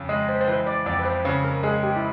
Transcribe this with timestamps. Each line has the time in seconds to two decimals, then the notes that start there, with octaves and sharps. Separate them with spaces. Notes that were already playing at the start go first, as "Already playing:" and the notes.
Already playing: F2 C#3
0.09 G#3 D#5
0.29 C5
0.41 C5
0.48 E3 B4
0.66 D5
0.86 F2 D5
0.99 B4
1.05 C5
1.24 C#3 B4
1.44 A#4
1.63 G#3 G#4
1.83 G4
1.96 E4